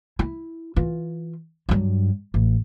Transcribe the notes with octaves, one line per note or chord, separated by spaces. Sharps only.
E4
E3 F4
G2 F#3
A1